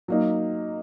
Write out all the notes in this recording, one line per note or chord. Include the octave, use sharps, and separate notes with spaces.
F#3 A#3 D#4